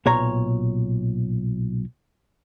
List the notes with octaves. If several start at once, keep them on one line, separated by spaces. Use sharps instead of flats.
B1 A#2 C#5 A#5